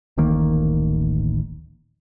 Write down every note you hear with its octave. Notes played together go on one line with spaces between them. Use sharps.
D1 A1 D#3 A#3